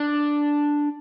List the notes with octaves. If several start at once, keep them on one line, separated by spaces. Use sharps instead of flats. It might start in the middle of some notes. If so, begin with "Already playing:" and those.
Already playing: D4